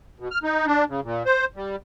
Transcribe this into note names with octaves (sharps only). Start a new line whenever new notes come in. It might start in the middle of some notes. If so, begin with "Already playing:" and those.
B2
F6
D#4
D4
C#3
A#2
C5
G3